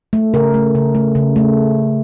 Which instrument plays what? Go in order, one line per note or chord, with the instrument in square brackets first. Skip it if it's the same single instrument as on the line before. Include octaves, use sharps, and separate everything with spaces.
[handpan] A3
C#3 A#4
A3
C#3
A3
C#3
A3